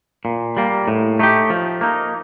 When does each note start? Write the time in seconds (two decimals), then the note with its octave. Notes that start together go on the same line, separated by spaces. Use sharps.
0.25 A#2
0.57 G3 A#3
0.88 A2
1.19 A3 D#4 G4
1.50 F3
1.81 A#3 D#4